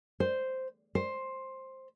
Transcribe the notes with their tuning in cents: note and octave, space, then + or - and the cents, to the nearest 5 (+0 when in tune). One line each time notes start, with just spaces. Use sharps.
C5 -5
C5 +10